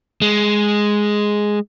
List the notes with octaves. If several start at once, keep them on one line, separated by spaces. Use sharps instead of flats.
G#3